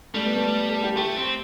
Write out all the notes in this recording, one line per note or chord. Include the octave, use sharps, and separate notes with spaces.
G3 A3
B3
A3
A4
G4
A3 G4
C4